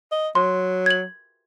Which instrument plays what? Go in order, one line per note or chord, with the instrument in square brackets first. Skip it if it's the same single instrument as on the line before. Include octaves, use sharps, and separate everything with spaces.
[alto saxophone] D#5
[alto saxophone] F#3 [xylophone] C6
[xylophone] G#6 F#7